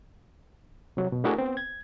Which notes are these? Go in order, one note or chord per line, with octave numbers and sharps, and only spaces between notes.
C3 F#3
B2
A3 D4 E4 F#4 G#4 A#4
B3 C4
G#6